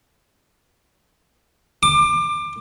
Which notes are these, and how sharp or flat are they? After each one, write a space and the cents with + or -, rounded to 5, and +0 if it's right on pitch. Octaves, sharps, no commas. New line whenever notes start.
D6 +25